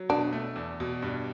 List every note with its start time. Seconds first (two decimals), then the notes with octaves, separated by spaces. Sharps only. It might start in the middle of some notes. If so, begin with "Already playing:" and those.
Already playing: F#3
0.09 B2 D4
0.33 A3
0.56 E2
0.80 B2
1.02 G2